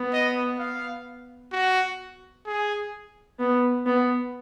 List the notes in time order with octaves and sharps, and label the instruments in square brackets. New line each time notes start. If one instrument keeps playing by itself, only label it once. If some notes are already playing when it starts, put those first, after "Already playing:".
Already playing: [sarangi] B3
[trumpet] D#5
F5
F#4
G#4
[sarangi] B3
B3